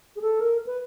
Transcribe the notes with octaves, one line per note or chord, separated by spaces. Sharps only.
G#4
A4
A#4
B4